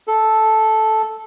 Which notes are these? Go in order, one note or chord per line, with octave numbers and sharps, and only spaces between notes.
A4